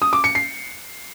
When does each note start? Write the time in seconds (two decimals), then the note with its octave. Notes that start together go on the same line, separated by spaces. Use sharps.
0.02 D#6
0.13 D6
0.24 C#7
0.35 C7